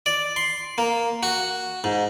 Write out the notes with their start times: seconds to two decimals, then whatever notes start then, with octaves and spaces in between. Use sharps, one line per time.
0.06 D5
0.36 C6
0.78 A#3
1.23 F#4
1.84 G#2